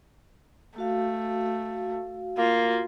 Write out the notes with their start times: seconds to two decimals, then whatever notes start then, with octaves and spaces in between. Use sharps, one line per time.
0.78 A3 F#4 F5
2.38 A#3 F4